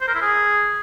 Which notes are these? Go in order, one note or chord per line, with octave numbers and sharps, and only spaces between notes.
C5
A#4
E4
G#4